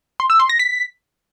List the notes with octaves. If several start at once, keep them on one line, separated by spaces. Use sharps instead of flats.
C6
E6
C6
A#6
B6